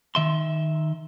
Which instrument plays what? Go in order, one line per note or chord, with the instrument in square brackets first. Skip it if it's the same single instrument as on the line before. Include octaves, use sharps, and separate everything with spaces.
[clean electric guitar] D#3 E5 C6